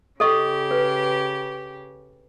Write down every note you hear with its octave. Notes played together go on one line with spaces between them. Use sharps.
C#3 G4 A4 D#5 C#6
B4